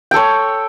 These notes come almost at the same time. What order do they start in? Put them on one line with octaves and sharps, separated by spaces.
G5 A4 C#5